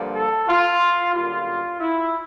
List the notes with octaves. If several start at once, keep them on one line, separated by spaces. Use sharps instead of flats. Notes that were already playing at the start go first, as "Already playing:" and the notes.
Already playing: G2 D3 F3 A#3
A4
F4
F#2 D3 G3 A#3 F4
E4